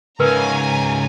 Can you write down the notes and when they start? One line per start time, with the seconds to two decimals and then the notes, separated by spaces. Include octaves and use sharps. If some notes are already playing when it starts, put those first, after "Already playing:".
0.20 G#2 C#3 A#4 B4 G#5 A#5